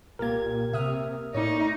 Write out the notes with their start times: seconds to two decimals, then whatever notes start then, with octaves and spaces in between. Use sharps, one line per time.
0.19 C2 A#2 A#3 G4 A#4 G#6
0.73 C3 E5 D#6 F6
1.34 A2 D#4 C#5 D5